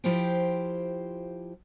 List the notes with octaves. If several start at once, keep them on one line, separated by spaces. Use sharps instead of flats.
F3 E4 F4 G4 C5 G5